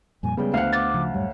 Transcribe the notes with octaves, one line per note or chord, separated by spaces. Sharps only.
F2 A#2 G3 G#5
C#3 G3 G#3 B3 G5
D2 C5 F5 F#5
D6 A6
C#3 F3
F#2 A2 G3 C#5